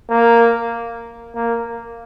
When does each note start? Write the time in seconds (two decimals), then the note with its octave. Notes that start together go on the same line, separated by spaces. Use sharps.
0.10 A#3
1.35 A#3